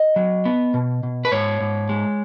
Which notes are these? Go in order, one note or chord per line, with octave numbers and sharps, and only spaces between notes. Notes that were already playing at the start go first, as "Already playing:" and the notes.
Already playing: D#5
F#3
B3
B2
B2
B4
G#2 C#5
G#2
G#3